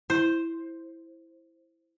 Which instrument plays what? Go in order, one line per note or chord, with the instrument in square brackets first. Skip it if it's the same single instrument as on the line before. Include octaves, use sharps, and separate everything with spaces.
[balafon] E4 [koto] C5